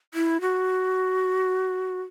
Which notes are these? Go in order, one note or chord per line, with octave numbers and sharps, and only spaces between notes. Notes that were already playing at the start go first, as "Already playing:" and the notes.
E4
F#4